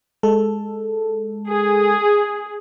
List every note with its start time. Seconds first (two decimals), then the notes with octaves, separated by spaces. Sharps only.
0.23 G#3 A4
1.47 G#4